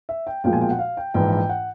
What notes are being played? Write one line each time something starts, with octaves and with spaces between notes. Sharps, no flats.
E5
G5
B1 A#2 F3 G#3 G5
G#5
G5
F#5
F5
G5
A#1 G#2 E3 G5
G5
F#5